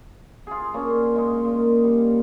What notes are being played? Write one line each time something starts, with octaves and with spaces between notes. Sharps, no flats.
F4 G#4
A#3 C#4 D4
G#3 D#4
A#2
G3